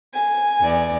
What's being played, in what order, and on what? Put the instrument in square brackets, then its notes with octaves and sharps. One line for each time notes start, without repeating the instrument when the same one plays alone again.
[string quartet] G#5
[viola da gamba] E2 D5